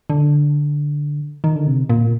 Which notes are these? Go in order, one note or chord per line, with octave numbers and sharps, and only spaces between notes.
D3
D#3
D3
C3
A#2